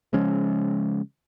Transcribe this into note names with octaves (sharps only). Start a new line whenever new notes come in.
C#3 F3 G#3 C#4